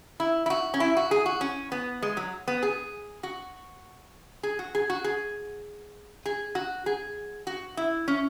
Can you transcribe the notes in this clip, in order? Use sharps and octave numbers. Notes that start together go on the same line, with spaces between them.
E4
E4
F#4
C#4
E4
F#4
G#4
F#4
C#4
B3
G#3
F#3
B3
G#4
F#4
G#4
F#4
G#4
F#4
G#4
G#4
F#4
G#4
F#4
E4
C#4